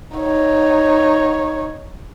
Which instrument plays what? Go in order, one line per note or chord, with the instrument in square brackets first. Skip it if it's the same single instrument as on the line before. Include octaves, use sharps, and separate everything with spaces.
[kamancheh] D#4 C#5